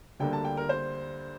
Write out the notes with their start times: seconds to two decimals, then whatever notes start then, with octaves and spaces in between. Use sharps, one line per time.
0.19 D2 D3 G3 A#3 G5
0.33 A5
0.45 G5
0.57 A#4
0.69 C5